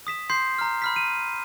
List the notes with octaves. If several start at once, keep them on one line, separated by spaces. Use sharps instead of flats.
D#6 B6 E7
C6 G6 C7
A#5 F6
B5 F6 B6
D#7